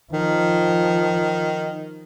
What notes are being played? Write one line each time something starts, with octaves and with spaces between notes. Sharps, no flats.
D#3 F3